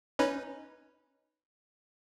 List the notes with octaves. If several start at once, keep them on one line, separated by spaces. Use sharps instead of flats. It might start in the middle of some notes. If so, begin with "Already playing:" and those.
C#4 D#4 B4